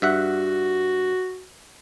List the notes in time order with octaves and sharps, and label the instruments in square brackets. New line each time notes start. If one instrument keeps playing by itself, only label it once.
[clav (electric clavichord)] G2 E5 F#5 [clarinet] F#4